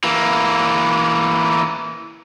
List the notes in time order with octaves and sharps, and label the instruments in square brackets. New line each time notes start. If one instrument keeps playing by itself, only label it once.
[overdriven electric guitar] E3 A#3